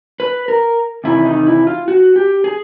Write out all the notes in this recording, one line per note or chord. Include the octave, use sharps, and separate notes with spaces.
B4
A#4
E2 C3 D#3 E4
D#4
E4
F4
F#4
G4
G#4